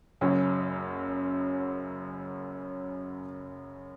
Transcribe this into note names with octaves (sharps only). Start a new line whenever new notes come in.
F#1 F#2 C#3 F#3 C#4